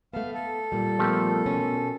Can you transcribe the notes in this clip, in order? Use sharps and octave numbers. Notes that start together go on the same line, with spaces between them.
A3 B3 F5 A5
A4
A#2 G3
F3 A3 B3 G4 A#4 E6
B2 C#4